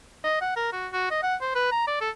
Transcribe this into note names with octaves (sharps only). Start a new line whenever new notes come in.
D#5
F#5
A#4
F#4
F#4
D#5
F#5
C5
B4
A#5
D5
A4